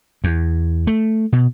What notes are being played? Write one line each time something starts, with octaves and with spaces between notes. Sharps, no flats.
E2
A3
B2